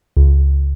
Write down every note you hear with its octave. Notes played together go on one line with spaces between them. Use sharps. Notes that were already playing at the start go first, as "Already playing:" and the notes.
C#2